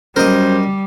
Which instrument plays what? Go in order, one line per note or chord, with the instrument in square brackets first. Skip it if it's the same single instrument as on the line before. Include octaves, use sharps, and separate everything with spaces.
[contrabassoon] F#2 [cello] G3 [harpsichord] A#4 D#5 [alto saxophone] C5